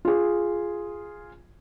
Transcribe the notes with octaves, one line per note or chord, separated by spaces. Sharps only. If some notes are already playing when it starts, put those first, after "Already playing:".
F4 G#4